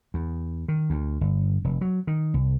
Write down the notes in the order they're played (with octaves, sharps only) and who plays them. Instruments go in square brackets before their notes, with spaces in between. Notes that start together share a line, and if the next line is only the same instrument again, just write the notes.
[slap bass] E2
D#3
D2
G1
F1
F#3
D#3
C2